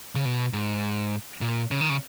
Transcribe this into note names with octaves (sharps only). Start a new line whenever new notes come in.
C#3
B2
G#2
A#2
C#3
D#3
C#3